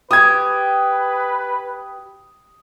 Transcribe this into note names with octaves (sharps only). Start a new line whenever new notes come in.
G4 B4 D#6 G#6